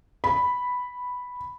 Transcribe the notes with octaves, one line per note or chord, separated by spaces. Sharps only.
B5